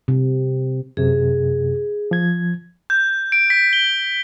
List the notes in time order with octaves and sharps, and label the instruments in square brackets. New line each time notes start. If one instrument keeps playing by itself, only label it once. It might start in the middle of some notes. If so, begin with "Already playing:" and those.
[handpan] C3
[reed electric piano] F#2 C3 [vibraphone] G#4
[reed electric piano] F3 G#6
[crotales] G6
D7
B6
G7